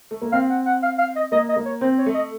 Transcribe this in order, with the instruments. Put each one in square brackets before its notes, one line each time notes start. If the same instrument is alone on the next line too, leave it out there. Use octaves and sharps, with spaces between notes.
[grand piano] A3
A#3
[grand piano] C4 [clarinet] F5
[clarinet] F#5
F#5
F5
F5
D#5
[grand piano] A#3 [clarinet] D#5
[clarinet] D#5
[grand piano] A#3
[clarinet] C#5
[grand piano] C4 [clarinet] C5
[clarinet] C#5
[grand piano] A3
[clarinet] D#5